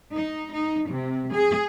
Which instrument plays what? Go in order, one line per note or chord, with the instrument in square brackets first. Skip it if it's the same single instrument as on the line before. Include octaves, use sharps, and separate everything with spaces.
[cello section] D#4
D#4
C3
G#4